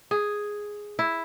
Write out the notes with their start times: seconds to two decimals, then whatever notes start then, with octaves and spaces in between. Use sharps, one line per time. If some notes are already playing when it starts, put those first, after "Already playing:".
0.11 G#4
0.99 E4